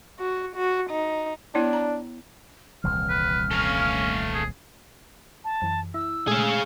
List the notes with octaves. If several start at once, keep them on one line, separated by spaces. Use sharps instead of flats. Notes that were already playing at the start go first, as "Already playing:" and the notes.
F#4
F#4
D#4
B3 D4 E4 C#5
A#5
D#1 C2 E3 F6
B4
A3 C#4 F5
G#4
A5
F#2 E3
E4 E6
A#2 G#3 A3 G#4 F5